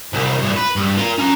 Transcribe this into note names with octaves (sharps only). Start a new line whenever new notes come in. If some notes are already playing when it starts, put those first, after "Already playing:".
C2 A#2
G2 A#2
B4
G2
F4 A#4
C#4 A#5